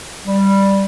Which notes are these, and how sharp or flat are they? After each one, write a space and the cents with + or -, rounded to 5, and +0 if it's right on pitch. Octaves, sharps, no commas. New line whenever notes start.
G3 +5